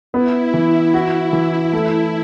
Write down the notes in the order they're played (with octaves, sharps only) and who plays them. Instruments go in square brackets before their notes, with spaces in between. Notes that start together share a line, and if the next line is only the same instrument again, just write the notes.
[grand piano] B3 [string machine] E4
[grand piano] E3 [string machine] E4
[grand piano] F#4
E3
A3